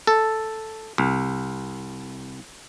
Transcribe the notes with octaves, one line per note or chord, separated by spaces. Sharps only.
A4
C2